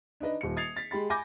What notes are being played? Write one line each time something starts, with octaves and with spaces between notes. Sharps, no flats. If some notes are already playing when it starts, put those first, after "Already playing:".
D4 D#4 B4 D#5
D#1 C#7
D#6 G#6 A6 C7 F7
A6 B6
G#3 G4 B5 A6
G#5 B5 D6 G6 A#6